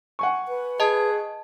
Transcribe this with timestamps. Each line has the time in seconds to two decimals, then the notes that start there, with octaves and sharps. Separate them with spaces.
0.19 F#5 G#5 C#6
0.48 B4
0.80 G#4 D#5 A5